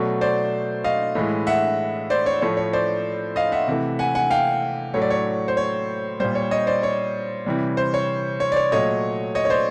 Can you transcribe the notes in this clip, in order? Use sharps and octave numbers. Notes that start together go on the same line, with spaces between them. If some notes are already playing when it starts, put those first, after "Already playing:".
Already playing: B2 F#3 A3 D5
C5 D5
D#5 F5
A2 E3 G#3
E5 F#5
C5 D5
C#5
A2 F3 A3 C#5
C#5
C5 D5
D#5 F5
E5 F#5
C3 E3 A3
F#5 G#5
F#5 G#5
F5 G5
A2 F#3 A3 C#5
D5
C#5
C5
C#5
A#2 G3 C5
C#5
C#5 D#5
C5 D5
C#5
C3 E3 G3
C5
C#5
C#5
D5
C#5
A#2 F#3 A3 C#5 D#5
C#5 D#5
C#5
C5 D5